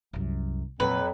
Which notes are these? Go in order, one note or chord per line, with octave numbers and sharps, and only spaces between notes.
C2 F#2
F2 A#2 F3 F#3 B4